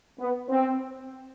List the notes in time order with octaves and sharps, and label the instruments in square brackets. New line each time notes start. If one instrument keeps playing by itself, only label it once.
[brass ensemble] B3
C4